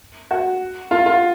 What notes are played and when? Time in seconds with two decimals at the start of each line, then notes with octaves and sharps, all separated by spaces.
0.31 F#4
0.91 F4
1.06 F4